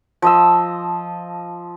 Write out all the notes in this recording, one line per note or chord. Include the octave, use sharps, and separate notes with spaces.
F3 D#5 E6